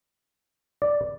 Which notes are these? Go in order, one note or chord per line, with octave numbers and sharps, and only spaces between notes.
D5